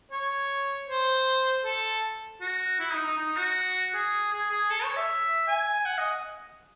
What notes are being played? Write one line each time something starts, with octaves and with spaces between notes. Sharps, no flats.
C#5
C5
A4
F#4
E4
D#4
D#4
D#4
F#4
G#4
G#4
G#4
A4
C#5
E5
G#5
F#5
D#5